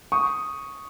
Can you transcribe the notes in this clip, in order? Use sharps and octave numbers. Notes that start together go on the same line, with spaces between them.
C#6 D#6